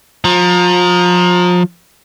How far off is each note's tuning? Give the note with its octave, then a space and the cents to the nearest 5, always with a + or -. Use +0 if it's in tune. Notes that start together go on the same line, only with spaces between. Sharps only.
F3 +30 A#5 +0